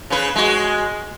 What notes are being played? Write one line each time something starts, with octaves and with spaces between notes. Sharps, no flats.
C#3 B4
G#3 F#4